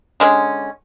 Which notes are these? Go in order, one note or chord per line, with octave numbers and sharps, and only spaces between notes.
D3 G#3 C#4